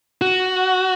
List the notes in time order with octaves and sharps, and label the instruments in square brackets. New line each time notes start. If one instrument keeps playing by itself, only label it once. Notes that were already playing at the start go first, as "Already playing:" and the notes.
[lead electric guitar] F#4